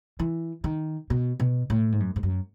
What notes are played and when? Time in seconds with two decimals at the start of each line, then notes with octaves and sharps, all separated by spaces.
0.19 E3
0.64 D#3
1.10 B2
1.40 B2
1.70 A2
1.92 G#2
2.00 F#2
2.16 G#2
2.23 F#2